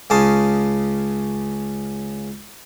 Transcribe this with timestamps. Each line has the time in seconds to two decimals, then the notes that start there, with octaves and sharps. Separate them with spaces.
0.10 C#2 C#3 C#4 A5 C6 D#6